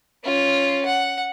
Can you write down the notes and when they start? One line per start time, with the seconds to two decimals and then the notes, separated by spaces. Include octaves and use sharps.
0.24 C#4 F4
0.85 F#5